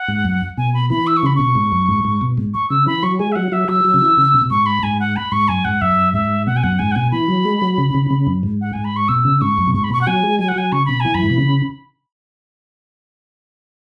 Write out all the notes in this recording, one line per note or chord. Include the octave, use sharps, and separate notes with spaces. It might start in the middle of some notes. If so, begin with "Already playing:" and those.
Already playing: F#5
G#2
F#2
B2 G#5
B5
E3 B5
E6
C#6
C#3 B5
B2 C#6
G#2
F#2
G#2
G#2
B2
G#2
C#6
C#3 E6
E3 B5
F#3 C#6
G#3 G#5
E5
F#3 F#5
F#3 E5
F#3 E6
F#3
C#3
E3
C#3
B2
B2
G#2 C#6
B5
G#2 G#5
F#5
B5
G#2 C#6
F#2 G#5
G#2 F#5
F#2 E5
G#2 E5
B2 F#5
G#5
F#2 F#5
G#2 G#5
F#5
B2 G#5
E3 B5
F#3
G#3
F#3
C#3
C#3
C#3
F#2
G#2
F#5
G#2 G#5
B5
C#6
B2 E6
C#3
G#2 C#6
F#2
B2
G#2 C#6
B5
B2 C#6
F#5
F#3 G#5
G#3
F#3 G#5
F#5
F#3 G#5
C#3 C#6
B2 B5
E3 G#5
F#2 B5
G#2
B2
C#3